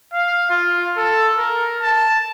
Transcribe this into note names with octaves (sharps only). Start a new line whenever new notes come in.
F5
F4
A4
A#4
A5